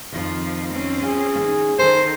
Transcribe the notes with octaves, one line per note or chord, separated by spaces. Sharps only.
F2 D#3 F3
C4 C#4
F4 G#4
D#3 A#3
D#3 A4 C5